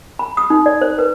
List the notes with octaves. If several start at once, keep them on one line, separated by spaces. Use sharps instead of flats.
B5
D#6
D#4
D5
C5
B4